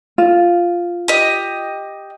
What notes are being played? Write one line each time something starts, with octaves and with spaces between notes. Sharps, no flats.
F4
G4 D#5